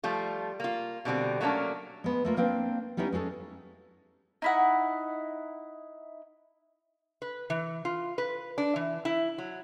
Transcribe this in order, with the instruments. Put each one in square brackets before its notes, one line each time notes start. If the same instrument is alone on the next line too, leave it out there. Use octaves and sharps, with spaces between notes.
[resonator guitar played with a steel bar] F3 G3 A3 F4
A#3 F4
B2 D3 G3 C4
F#3 A3 A#3 C#4 D4
[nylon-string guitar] G#3 B3
A3 A#3 F4
A#3 C4 D4 B4
G3 B3 C#4 D#4 E4
G#3 C#4 G#4 A4
[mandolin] D#4 E4 F#5
[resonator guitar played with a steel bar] B4
E3
F4
B4
D4
E3
E4
F#3